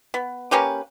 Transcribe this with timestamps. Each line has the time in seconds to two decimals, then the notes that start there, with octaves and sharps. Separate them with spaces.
0.14 B3
0.51 A#3 C#4 G4 B4